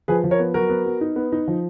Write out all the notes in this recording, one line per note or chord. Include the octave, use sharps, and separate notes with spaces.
F3 G#4 B4
F3
A#4 C#5
B3
F#3 F#4 A#4
B3
B3
D#4
B3
D#4
F3